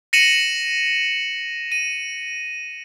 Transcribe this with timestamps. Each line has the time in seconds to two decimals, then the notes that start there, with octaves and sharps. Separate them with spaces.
0.13 A#6 C#7 D#7 E7 F#7
1.72 D#7